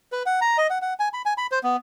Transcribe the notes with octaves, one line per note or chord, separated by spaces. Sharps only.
B4
F#5
A#5
D#5
F#5
F#5
G#5
B5
G#5
B5
C5
B3